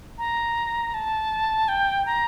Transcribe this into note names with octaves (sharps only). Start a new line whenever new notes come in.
A#5
A5
G5
A#5